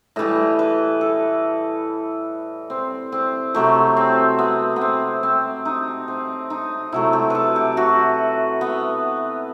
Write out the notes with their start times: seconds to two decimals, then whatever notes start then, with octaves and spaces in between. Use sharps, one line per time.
0.16 A2 E3 G3 D#5
0.59 B4
1.01 A4
2.70 C4
3.12 C4
3.54 C3 F#3 A3 G4
3.97 C4
4.39 B3
4.76 B3
4.81 C4
5.23 C4
5.65 D#4
6.08 C4
6.50 D#4
6.92 C3 F#3 A3 E4
7.13 G4
7.30 A4 B4
7.56 G4
7.77 F#4
8.61 B3